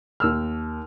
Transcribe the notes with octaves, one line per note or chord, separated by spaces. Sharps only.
D#2 E6 F6